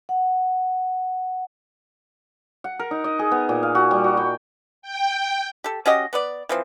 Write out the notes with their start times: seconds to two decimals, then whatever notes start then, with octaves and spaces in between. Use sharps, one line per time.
0.09 F#5
2.64 F#5
2.79 A#4
2.91 D#4
3.04 D#5
3.19 G#4
3.31 B3
3.49 A#2
3.63 F5
3.75 F#4
3.91 G3
4.04 F#4
4.17 G5
4.82 G5
5.64 G4 A4
5.86 C#4 F#4 G4 D#5
6.13 B3 B4 D5
6.49 E3 F3 C4